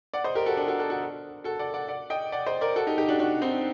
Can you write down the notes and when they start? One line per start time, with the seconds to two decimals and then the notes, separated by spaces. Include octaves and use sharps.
0.14 D5 F#5
0.24 C5 D#5
0.35 G4 A#4
0.46 F#4 A4
0.57 D4
0.68 F#4 A4
0.79 F#4 A4
0.90 F#4 A4
1.44 F#4 A4
1.59 D5 F#5
1.74 D5 F#5
1.88 D5 F#5
2.10 D#5 G5
2.32 D5 F#5
2.46 C5 D#5
2.61 A#4 D5
2.76 F#4 A4
2.87 D#4 G4
2.98 D#4 G4
3.08 D4 F#4
3.19 D4 F#4
3.41 C4 D#4